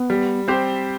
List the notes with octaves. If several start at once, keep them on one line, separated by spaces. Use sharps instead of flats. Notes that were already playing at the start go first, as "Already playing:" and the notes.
Already playing: B3
G3
C4 G4 C5